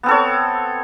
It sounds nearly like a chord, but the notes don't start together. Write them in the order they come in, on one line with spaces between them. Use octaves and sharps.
B3 C4 A4 C#5